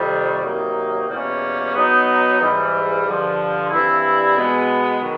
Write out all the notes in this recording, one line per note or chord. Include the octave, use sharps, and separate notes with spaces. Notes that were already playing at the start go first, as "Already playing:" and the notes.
Already playing: F2 C3 D#3 G3
C3 D#3 F#3 A#3 D#4
E2 B2 G3 A#3 C#4
F#3 B3 D#4
G#2 E3 G3
G2 D3 F3
G2 E3 G3 C4 E4
B2 G#3 B3
D#3 F#3